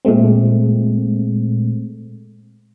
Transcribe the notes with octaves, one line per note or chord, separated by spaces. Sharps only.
A#2 G#3 A3 C4